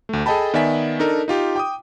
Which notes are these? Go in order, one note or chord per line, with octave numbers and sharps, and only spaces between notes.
D2 A3
G#4 A4 D#5 G5 A5 B5
D#3 B3 D5 E5 G#5 B6
D4 D#4 A4 A#4
D#4 F4 G4
G5 D6 D#6